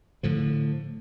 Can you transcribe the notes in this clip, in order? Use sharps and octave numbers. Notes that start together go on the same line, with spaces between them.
A2 D3 F3